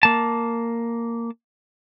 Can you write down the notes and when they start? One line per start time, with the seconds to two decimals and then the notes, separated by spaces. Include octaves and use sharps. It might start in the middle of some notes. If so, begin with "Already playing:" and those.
0.03 A#3 A5